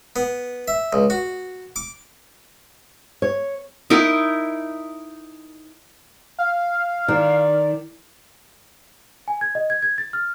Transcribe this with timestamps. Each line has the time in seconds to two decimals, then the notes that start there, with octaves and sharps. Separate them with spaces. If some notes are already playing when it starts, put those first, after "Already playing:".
0.16 B3
0.68 E5
0.93 C#2
1.10 F#4
1.76 D6
3.22 C#5
3.90 D#4 E4 A#4
6.39 F5
7.08 D#3 D5
9.28 G#5
9.41 G#6
9.55 D#5
9.70 G#6
9.82 G#6
9.98 A6
10.13 F6